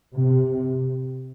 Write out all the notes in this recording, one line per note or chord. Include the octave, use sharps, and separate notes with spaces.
C3